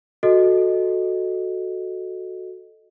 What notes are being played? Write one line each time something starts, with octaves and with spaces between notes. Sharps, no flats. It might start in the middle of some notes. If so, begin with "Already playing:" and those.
F#4 A4 D#5